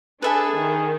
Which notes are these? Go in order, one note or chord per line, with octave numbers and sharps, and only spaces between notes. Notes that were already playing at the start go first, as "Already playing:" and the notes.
D4 G#4 A4 B4 E5 G#5
D#3